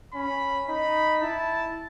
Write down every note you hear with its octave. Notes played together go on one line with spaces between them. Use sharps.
C#4 B5
D#4 B5
E4 A5